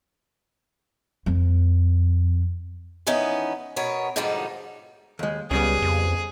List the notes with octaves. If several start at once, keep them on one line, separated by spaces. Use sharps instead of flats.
F2
D#3 E3 B3 C#4 D#4
B2 B3 A#4 C#5
G#2 B2 D3 F3 G3 D#4
D#2 G#3
C#2 C#3 G3 B3 G#4
F2